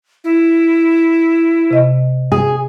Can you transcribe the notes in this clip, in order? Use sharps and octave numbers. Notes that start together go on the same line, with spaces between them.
E4
C3 D#5
G#4